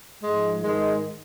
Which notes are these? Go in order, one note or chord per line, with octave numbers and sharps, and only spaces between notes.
G#2 F3 G#3
G#2 D#3 G#3